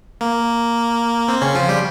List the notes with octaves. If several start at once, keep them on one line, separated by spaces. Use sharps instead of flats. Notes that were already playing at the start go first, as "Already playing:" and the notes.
A#3
C4
C#3 C#4
F3 F4
G3 G4